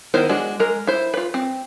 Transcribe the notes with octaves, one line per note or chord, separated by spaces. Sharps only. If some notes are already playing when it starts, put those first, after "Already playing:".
D#3 B3 E4 A#4 C5
G#3 D4 F#4
G#3 A#4
E4 C5
F4 B4
C4